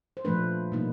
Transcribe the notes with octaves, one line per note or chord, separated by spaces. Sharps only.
C5
A#2 F3 A3 D4 B4
B2 G3 A#3 D#4